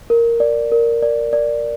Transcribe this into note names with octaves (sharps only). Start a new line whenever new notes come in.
A#4
D5
A#4
D5
D5